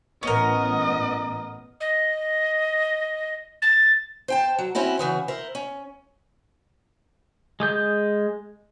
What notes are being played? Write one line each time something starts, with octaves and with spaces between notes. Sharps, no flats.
A1 A2 B3 C#4 A#4 D#5
D#5
A6
C5 G5 A5
F#3
C4 C#4 E4 F#4
C#3 E3 F#4
E4 A#4 C5
C#4
G#3 D#6 G6